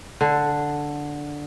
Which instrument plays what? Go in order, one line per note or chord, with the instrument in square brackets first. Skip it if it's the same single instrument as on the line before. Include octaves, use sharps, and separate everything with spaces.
[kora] D3